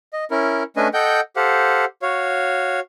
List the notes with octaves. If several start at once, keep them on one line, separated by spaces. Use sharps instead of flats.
D#5
C#4 E4 A#4
A3 C#4 D4 B4 D#5 G#5
A4 D#5 F#5 G5 G6
G4 A4 C5 F5 F#5
F#4 C#5 F5